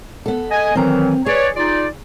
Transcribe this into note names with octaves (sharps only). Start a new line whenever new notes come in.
B3 A4
D#5 G#5
D#3 E3 F#3 C4 A#5
G#4 B4 C#5 D5
D#4 F4 D5